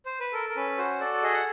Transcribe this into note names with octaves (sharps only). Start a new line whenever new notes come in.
C5
B4
A4 A#4
A#4
C#4 B4
F#4 C5
A4 D5
G#4 D#5
F#5